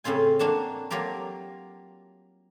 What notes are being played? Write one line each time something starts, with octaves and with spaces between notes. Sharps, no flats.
A2 C#3 C4 F4 G#5
A#3 D4 F#4 A5
F#3 A#3 F4 G4 A#4